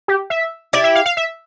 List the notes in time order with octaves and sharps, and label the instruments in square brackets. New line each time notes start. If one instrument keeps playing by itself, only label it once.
[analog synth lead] G4
E5
[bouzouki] E4 G4 [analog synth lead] D5
[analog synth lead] E5
F5
F5
E5